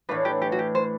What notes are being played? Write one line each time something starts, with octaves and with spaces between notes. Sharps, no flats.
A2 E3 A3 D4 B4
G4
G4
F#4
G4
C5